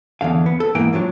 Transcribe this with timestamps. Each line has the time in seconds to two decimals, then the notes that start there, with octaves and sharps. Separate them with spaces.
0.21 E2 G2 D3 F5
0.46 B3
0.60 A4
0.75 E2 G#2 E3 A#3 G5
0.93 A2 F3 F#3 D4